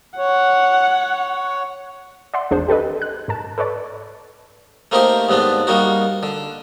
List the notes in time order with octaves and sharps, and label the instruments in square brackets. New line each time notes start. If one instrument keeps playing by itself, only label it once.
[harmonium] C#5 [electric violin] F#5
[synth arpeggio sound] D5 E5 F#5 C6
G#1 E2 D4 G#4 C5
G4 A4 B4 D#5
F#6
G#2 A#4 A5
A4 B4 C#5 D5
[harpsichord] A3 A#3 C4 D#4 G4 C5
D#2 G#2 B3 C4 D4
G3 A#3 D#4 F#4
D3